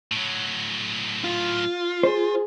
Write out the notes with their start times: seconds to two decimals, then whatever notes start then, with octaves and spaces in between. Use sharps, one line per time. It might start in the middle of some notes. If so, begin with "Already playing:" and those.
0.12 A2 F#3
1.24 F4
2.03 G#4 C5